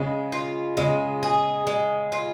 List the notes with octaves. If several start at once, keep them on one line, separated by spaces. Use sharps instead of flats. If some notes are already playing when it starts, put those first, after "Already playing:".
Already playing: C#3 G#3
F4
C#3 G#3
G#4
G#3
F4